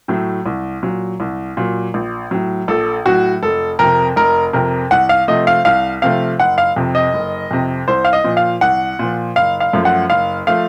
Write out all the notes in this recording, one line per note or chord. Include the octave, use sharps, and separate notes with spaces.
A2 F#3 A3
C2
A#2 F#3
C2
A#2 F#3
A#1
A2 F#3
A#1 A4
A2 F#3 F#4
F1 A4
F2 C3 A#4
F1 A#4
F2 C3 A#4
C2 F#5
F5
C3 F3 A3 D#5
F5
C2 F5
C3 F3 A3 F5
F#1 F#5
F5
F2 C3
D#5
F#1
F2 C3
C2 C5
F5
D#5
A#2 F3
F5
C2 F#5
A#2 F3
F#1 F5
F5
F#2 F3 A3
F#5
F#1 F5
F3 A3 F5